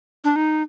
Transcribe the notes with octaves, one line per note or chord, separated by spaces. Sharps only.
D4
D#4